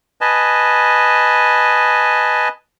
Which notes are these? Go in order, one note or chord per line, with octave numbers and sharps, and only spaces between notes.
B4 D#5 G#5 A5